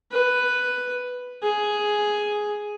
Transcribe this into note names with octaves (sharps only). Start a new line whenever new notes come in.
B4
G#4